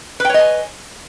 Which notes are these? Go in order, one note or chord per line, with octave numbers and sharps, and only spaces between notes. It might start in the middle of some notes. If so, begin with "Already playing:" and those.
B4 C#5 D#5 G5 G#5